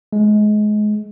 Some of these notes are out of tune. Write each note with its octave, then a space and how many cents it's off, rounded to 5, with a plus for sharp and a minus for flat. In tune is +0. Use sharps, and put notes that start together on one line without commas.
G#3 +25